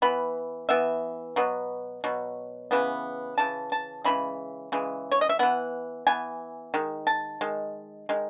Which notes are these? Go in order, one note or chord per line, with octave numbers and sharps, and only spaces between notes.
E3 B3 B5
E3 B3 E5
B2 F#3 B3
B2 F#3
C#3 E3 B3
C#3 E3 A5
A5
C#3 E3 G#3 B5
C#3 E3 G#3
C#5
D#5
E5
E3 B3 F#5
E3 B3 G#5
D#3 G#3
A5
D#3 G#3
D#3 G#3